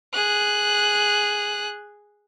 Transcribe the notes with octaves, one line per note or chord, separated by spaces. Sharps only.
G#4 F#6